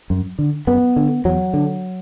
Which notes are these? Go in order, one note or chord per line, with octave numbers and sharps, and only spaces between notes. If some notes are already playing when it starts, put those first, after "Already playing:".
F#2
D3
F#2 B3
D3
E2 F#3
D3